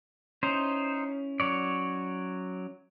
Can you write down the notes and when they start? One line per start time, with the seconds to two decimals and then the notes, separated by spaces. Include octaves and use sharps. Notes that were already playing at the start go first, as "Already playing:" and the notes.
0.43 C#4 D#4 E4 C5
1.40 F#3 C#5 D5